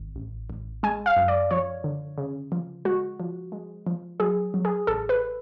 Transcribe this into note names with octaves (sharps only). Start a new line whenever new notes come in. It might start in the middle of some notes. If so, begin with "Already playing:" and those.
Already playing: G#1
A1
A1
G#3 G#5
F5
F#2
D5
F3 C#5
D3
C#3
F3
G#3 F#4
F3
G#3
F3
F#3 G#4
F#3
G#4
A1 A4
B4